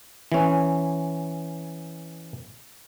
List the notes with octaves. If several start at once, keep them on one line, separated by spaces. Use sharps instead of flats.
E3 C#4